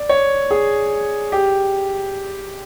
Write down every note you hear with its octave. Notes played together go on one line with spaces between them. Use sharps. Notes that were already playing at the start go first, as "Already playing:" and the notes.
Already playing: D5
C#5
G#4
G4